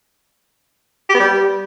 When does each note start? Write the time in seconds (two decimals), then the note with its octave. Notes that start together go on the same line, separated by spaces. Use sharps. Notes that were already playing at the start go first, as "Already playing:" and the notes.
1.09 G4
1.15 B3
1.20 G3